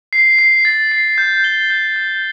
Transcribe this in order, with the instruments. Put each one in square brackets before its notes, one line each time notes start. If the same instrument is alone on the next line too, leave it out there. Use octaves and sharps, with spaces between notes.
[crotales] C7
C7
A6
C7
G6
G7
G6
G6